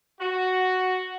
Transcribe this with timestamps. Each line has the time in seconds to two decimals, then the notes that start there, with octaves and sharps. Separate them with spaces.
0.20 F#4